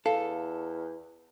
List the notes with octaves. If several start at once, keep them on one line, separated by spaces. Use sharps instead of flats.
E2 A4 F5